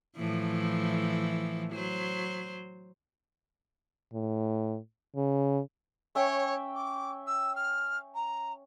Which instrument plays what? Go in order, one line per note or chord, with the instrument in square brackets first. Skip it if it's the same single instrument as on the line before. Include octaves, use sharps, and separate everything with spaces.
[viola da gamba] A2 E3 F3
F#3 C5
[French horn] A2
C#3
[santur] C#4 E5 G5 [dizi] C#5
[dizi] D6
E6
F6
A#5